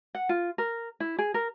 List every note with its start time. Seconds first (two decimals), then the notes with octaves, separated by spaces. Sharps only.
0.15 F#5
0.29 F4
0.58 A#4
1.00 E4
1.18 G#4
1.34 A#4